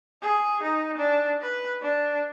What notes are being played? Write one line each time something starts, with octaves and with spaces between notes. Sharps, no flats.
G#4
D#4
D4
B4
D4